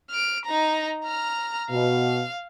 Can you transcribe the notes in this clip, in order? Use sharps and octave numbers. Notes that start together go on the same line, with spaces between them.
F6 D7
D#4 A#5
A#5 F6
B2 F5